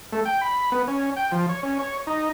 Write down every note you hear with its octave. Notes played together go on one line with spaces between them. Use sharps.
A3
G5
B5
B3
C#4
G5
F3
C#5
C#4
C#5
D#4